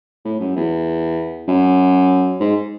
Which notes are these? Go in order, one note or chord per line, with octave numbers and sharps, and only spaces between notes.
A2
F#2
E2
F#2
G#2